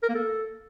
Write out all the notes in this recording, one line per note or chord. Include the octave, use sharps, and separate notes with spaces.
A#4
A#3
A4